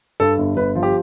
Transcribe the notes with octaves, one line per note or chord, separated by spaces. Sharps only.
G2 A4
G1
G1 B4
F3
G4